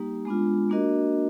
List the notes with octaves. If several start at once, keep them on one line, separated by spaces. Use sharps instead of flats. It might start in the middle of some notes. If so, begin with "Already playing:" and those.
Already playing: G3 A#3 D#4 G4
G#3 B3 D4 F4
A#3 D4 F#4 A#4 D#5